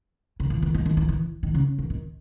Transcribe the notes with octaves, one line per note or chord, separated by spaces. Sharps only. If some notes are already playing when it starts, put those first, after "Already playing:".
C#3
E3
E3
D#3
D#3
E3
E3
D#3
C#3
C#3
D#3